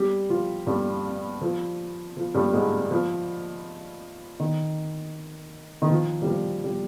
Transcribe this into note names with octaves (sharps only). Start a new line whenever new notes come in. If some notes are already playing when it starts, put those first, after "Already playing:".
Already playing: G3 G4
F3 F4
G2 G3
F3
F3
G2 G3
G#2 G#3
F3
D#3
D#3
F3
G3
F3
G3